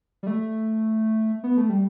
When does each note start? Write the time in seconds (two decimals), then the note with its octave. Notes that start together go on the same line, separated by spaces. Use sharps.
0.23 G3
0.27 A3
1.44 B3
1.57 A3
1.70 G3